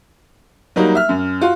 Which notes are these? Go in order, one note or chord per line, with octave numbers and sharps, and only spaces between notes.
F#3 G3 A#3 D#4
E5 F6
F#2
F4 F#4